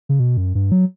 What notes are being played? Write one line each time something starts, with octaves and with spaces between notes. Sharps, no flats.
C#3
B2
F#2
G2
F#3